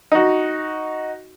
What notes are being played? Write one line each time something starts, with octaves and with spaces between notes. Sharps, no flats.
D#4 F#4